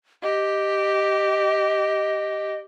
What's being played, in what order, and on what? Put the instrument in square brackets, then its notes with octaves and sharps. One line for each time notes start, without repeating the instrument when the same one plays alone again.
[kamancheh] G4 [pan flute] D#5